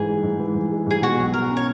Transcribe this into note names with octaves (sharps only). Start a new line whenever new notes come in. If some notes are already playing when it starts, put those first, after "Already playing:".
Already playing: G#2 E3 G#4
G#3
G#2
E3
G#2
G#3
G#2 G#4
B2 F#4
B1
F#3 A#4
C#4
C#5